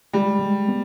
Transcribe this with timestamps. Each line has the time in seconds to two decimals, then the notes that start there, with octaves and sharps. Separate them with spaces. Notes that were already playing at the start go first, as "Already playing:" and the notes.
0.13 G3 G#3
0.42 G#3
0.68 B3